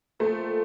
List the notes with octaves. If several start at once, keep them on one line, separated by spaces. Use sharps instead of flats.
A#2 F3 G#3 A3 C4